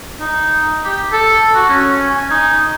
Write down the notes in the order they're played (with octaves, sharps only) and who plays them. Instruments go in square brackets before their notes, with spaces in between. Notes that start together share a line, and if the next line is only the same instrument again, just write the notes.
[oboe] D#4
G4
A4
F#4
C#4
G#5
D#4